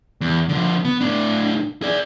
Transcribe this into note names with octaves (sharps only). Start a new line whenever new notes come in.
E2
D3 F3
B3
A2 D4
G#4 D5